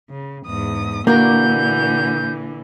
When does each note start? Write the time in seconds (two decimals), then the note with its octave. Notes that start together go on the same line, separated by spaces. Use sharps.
0.10 C#3
0.47 E2 G#2 D#6
1.07 A#2 D3 E3 A#3 D4 F#4 A#4 G6